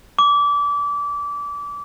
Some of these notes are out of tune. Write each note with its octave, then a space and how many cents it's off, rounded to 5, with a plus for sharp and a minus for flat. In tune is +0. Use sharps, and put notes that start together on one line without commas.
D6 -25